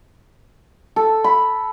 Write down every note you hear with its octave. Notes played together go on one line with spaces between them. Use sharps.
A4
B5